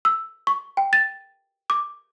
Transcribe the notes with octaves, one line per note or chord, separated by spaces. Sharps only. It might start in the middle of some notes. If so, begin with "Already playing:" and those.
E6
C#6
G5
A6
D6